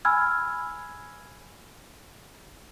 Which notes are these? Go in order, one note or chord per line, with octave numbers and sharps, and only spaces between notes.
G#5 B5 E6 F6 G#6